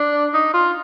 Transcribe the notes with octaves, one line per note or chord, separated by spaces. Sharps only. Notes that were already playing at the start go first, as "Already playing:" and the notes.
Already playing: D4
D#4
F4